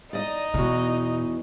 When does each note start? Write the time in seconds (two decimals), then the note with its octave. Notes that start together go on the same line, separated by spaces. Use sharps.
0.13 D#4 D5 D#5
0.54 E2 B2 F#4